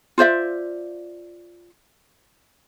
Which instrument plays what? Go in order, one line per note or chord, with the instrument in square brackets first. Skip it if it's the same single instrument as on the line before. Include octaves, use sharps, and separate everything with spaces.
[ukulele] F4 C5 D5 E5